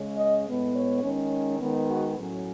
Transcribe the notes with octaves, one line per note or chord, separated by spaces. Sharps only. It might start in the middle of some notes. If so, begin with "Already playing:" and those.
Already playing: C#3 G#3 C#4
D#5
A2 G#3 B3
C#5
D#3 G#3 C#4
D#3 G#3 B3
F#4
A2 F#3 C#4